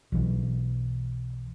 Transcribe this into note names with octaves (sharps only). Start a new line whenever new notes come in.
B1 E3